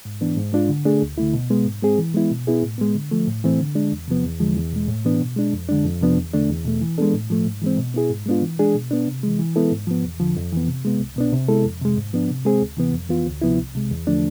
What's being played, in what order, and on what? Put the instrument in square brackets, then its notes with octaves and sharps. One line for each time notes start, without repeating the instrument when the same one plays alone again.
[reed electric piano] G#2
E3 B3 D4
G#2
G#3 D4 F4
D3
A3 D4 G#4
D2
D3 A3 E4
B2
G#3 B3
G#2
G#3 C4 G#4
E3
G#3 B3 E4
B2
B3 E4 G#4
A2
G#3 B3
D3
F3 A3
A2
E3 A3 C4
D3
G#3 D4
E2
C3 F3 B3
E2
D3 F3 G#3
E2
B2 G#3
A2
E3 B3 D4
B2
G#3 D4
F2
D3 G#3 D4
F2
C3 F3 B3 D4
E2
D3 A3 D4
E2
B2 A3
E3
G#3 B3 D4 A4
A2
F3 A3
G#2
E3 G#3 C4
B2
B3 E4 G#4
G#2
G#3 B3 D4 F4
E3
G#3 D4 G#4
B2
B3 D4
C3
E3 G#3
E3
G#3 B3 E4 A4
G#2
F3 B3
E2
D3 F3
F2
E3 B3
C3
G#3 B3
C2
B2 B3 D4
C3
G#3 B3 E4 A4
F2
C3 G#3
G#2
F3 B3 D4
C3
G#3 C4 G#4
D2
C3 E3 B3
F2
E3 B3 F4
D2
C3 F3 B3 E4
C2
C3 G#3
E2
D3 F3 A3 D4